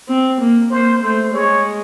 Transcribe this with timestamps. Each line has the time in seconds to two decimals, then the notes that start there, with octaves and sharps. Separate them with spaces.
0.08 C4
0.40 A#3
0.70 A#3 C5
1.02 A3 C5
1.33 G#3 C#5